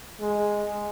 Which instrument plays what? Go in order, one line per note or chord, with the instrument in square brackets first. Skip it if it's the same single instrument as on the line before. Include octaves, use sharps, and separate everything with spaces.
[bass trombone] G#3